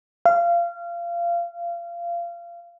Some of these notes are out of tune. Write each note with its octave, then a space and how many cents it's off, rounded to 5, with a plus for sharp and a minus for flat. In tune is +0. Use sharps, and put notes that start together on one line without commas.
F5 -25